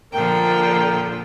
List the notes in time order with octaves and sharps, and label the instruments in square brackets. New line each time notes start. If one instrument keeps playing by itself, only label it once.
[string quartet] A#2 D3 F3 [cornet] A#4 [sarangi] G5